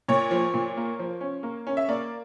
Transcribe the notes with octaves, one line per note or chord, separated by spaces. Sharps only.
A#2 C#5
F3
A#2
A#3
F3
C#4
A#3
C#4
E5
A#3 D5